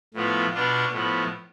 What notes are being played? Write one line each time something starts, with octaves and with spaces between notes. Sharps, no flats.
A2 F3 B3 F4
B2 B3 D4 F4
A2 F3 B3